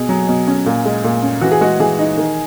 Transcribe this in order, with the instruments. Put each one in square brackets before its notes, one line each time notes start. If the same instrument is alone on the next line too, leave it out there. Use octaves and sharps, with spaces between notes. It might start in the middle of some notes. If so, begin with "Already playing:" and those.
Already playing: [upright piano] B2 G#4
F#3
B2
C#4
A#2
G#3
A#2
C#4
E3 F#4
G#4
G#3 F#4
E3 G#4
D#4
D#3